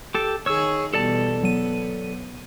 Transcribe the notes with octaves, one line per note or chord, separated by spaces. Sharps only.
G4 A4
D#3 G#4 C#5 E6
E2 B2 G3 A4 D5 A5
F#3 B3 D#7